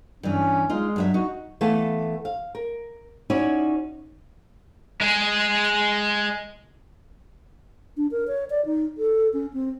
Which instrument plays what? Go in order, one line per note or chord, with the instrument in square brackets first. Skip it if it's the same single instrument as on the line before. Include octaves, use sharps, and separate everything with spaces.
[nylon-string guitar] G2 E3 [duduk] C#4
[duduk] G#3 [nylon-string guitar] D#4 F4
[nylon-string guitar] G2 F#3 E5
[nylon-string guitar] D#4 [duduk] F#4
[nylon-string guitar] E3 A3 B3 F5 A5
F5
A#4
C#4 D#4 E4 F#4 C#5 D5
[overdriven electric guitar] G#3 G#4
[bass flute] D4
A#4
C#5
D5
D#4
A4
C#4
C4